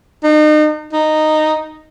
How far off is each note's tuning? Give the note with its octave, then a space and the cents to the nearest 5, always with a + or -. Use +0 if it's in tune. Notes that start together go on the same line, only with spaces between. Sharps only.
D#4 -35
D#4 -10